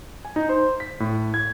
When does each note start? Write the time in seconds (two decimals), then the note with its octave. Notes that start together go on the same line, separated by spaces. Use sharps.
0.25 G#5
0.36 D#4
0.49 C5
0.80 B6
1.00 A2
1.34 G#6